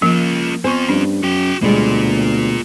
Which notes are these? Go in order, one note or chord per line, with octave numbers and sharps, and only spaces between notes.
F3 A#3 C#4 F4
B3 C4 F4 C5 C#6
G2 C#4
F#2 F#4 G5
D2 B2 G3 G#3 A#3 F4